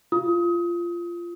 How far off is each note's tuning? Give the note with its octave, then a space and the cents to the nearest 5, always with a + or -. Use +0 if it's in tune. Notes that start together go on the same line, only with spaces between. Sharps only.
F4 -15 D#6 +30